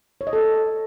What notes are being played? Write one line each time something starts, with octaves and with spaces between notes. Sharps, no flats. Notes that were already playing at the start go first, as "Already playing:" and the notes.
C#5
D#5
A4